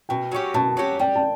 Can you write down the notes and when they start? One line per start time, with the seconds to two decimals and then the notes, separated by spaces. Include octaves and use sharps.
0.09 B2 G5
0.32 F#3 C#4 G4
0.54 B2 A5
0.77 F#3 C#4 G4
0.99 G3 G5
1.15 A5